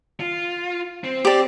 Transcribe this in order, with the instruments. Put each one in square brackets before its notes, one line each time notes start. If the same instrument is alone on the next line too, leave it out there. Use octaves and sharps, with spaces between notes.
[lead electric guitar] F4
C4
[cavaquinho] G4 D5